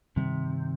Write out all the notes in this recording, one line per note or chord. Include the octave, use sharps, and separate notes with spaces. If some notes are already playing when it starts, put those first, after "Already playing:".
G2 C3 D#3 G3 C4